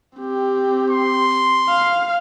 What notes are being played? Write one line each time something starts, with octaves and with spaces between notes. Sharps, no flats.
C4 G4
C6
F5